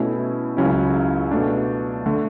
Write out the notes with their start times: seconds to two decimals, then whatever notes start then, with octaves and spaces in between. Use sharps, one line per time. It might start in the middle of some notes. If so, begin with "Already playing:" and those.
Already playing: B2 A3 C#4 E4
0.57 C#2 C#3 F#3 C#4 E4
1.31 B2 A3 D4
2.06 D3 A3